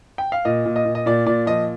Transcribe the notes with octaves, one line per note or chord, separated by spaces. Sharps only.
G5
F5
A#2 D#5
A#2
D#5
A#2
D#5
A#2 D5
A#2 D5
F3 D#5